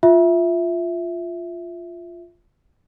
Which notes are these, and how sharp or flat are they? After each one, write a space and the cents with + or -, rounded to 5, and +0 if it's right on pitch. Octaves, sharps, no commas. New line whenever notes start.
F4 +0 E5 +0